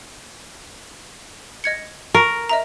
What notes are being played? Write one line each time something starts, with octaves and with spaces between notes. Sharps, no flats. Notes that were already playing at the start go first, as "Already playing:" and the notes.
D#5 G#6 C#7
A#4 C#6
D#5 E5 A#5